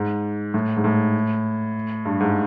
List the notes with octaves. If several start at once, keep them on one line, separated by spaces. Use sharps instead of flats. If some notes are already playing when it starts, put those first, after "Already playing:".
Already playing: G#2
A2
G#2
A2
G2
G#2